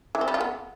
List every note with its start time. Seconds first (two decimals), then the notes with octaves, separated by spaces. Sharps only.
0.15 E3
0.21 C4
0.28 G3
0.34 F4
0.41 B3